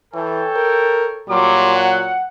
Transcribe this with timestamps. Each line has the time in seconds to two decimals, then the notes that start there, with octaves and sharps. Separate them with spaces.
0.14 E3 A4 C#5 G5
0.56 A#4
1.29 A#2 F#3 G3 C6 D6
1.75 F#5